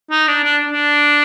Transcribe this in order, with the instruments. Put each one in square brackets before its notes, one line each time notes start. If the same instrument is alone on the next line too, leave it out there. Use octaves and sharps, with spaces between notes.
[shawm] D#4
D4
D4
D4